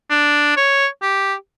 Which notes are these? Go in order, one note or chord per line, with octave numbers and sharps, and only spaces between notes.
D4
C#5
G4